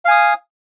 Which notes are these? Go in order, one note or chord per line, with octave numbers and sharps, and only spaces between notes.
F5 G#5 D#6